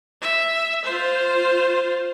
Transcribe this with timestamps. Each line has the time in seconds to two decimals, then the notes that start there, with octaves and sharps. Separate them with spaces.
0.22 E5
0.85 F4 C5